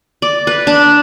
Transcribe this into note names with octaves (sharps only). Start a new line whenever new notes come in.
D5
B4
D4